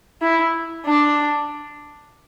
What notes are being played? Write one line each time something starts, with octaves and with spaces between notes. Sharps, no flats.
E4
D4